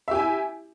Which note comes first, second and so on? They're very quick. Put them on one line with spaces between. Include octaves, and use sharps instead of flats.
E5 G4 G#5 E4